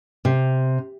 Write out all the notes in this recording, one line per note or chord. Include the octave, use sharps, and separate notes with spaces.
C3